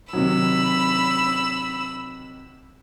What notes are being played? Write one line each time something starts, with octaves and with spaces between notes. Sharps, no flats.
C3 D#3 F#3 B5 E6